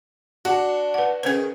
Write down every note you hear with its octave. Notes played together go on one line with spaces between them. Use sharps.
D4 F#4
B4 F#5
D#3 C#4 G#4 B4 C5